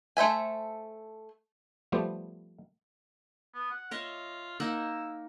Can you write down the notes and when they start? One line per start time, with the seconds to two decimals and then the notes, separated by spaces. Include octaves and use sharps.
0.17 A3 C5 E5 G#5
1.92 F3 G3 A3 B3 G4 C5
3.54 B3
3.71 F#5
3.91 F4 C#5 D#5 E5
4.60 A#3 D#4 F#5 E6